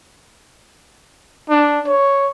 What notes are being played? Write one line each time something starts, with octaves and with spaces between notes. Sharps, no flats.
D4
C#5